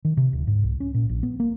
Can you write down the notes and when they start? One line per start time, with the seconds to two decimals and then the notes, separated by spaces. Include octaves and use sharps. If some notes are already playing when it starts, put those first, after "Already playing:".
0.05 D#3
0.17 C3
0.33 D1
0.47 G#2
0.63 C2
0.80 C#4
0.94 A#2
1.09 A#1
1.23 B3
1.40 A#3